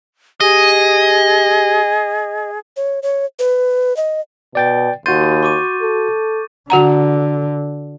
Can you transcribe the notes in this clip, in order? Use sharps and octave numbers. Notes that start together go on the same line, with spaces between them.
G4 G#4 D#5
C#5
C#5
B4
D#5
B2 D5 G5 A6
D#2 F#4 C6 G6 A6 D#7
C#6 D6 D#7
A4
D3 F#4 F#5 A#5